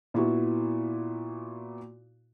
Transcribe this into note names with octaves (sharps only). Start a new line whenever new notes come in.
A#2 B3 E4 F#4